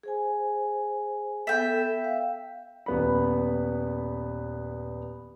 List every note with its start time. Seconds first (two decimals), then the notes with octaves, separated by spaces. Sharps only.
0.03 G#4 C5 G#5
1.47 B3 A4 E5 G5
2.04 F5
2.86 D#1 B3 B5